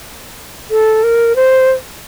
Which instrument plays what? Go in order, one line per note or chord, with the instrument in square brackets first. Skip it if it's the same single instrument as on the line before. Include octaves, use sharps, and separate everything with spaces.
[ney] A4
A#4
C5